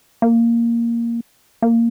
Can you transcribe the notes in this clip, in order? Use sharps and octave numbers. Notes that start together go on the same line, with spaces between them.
A#3
A#3